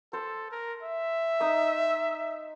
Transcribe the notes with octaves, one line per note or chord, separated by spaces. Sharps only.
A4 C5
A#4
E5
D#4 D#6 E6